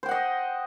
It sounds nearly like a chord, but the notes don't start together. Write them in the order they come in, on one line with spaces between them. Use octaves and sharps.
C5 G5 F#5 D#5